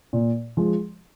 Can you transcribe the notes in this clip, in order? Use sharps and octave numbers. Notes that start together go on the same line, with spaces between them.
A#2
F3 G#3